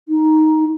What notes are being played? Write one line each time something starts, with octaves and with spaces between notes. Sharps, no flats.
D#4